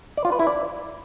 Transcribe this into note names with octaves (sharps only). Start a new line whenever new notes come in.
D5
F4
B4
E4
D5